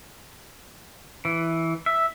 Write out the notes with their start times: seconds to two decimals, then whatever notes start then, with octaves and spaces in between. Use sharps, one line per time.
1.25 E3
1.86 E5